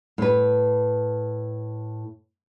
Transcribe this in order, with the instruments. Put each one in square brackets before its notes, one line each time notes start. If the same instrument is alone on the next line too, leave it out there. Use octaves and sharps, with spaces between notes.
[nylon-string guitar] A2 B4